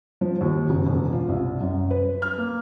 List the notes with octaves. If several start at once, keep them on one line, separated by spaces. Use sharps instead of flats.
F3
D#2
F#1
E1
F4
C2
F#2
B4
F6
A#3